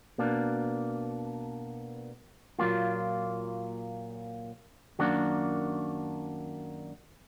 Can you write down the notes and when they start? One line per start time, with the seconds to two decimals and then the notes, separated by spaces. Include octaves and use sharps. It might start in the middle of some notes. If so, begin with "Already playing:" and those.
0.18 B2 A#3 D4
2.59 A#2 F#3 A#3 F4
4.99 F#2 D#3 A#3 D4 F#4